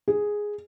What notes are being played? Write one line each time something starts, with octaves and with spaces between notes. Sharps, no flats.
G#4